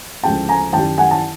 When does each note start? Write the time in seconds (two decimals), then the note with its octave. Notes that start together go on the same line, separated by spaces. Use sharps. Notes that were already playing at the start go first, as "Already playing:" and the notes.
0.23 D2 C#3 F3 G#3 G5 A5
0.49 G#5 A#5
0.73 F#2 D#3 G3 G5 A5
0.98 F#5 G#5
1.11 A5